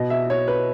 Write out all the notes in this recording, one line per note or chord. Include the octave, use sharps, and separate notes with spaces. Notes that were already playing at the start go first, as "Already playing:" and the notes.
Already playing: B2 D#5
E5
C#5
B4